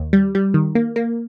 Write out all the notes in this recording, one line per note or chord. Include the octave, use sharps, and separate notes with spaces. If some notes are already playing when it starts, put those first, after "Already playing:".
Already playing: D#2
G3
G3
D#3
A#3
A#3